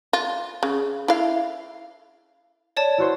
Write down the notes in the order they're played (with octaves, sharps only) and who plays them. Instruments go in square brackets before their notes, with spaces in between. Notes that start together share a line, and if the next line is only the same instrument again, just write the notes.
[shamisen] F4
C#3
E4 F5
[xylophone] C#5 D5 A5
[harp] E4 F#4 C5